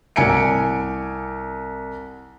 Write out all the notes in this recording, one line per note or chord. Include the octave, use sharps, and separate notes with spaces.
C2 G#5 C#7 D7